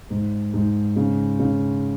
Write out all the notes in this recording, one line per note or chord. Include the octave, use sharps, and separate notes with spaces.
G#2
G#2
C#3
C#3